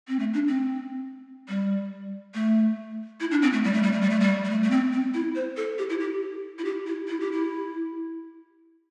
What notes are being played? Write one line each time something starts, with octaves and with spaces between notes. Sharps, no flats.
C4
A3
D4
C4
G3
A3
E4
D4
C4
A3
G3
A3
G3
A3
G3
A3
G3
G3
A3
A3
C4
C4
E4
C5
A4
G4
E4
G4
E4
G4
E4
E4
G4
E4